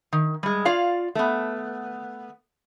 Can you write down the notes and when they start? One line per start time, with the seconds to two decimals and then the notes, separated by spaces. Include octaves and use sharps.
0.13 D#3
0.43 G3 G#3
0.65 F4 D5 F5
1.15 A3 B3